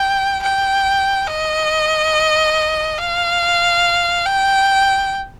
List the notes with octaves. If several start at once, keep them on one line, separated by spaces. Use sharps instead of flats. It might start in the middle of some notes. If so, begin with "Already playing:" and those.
Already playing: G5
G5
D#5
F5
G5